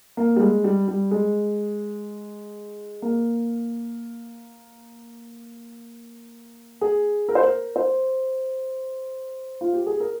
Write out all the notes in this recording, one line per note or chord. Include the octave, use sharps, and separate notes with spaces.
A#3
G3
G#3
G3
G3
G#3
A#3
G#4
A#4
C5
A#4
C5
F4
G4
G#4
A#4